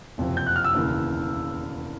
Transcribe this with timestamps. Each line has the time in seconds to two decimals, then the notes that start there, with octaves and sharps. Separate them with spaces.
0.18 F#1 F2 C3
0.37 G6
0.47 F#6
0.56 F6
0.64 E6
0.74 E1 D#2 C#3 E3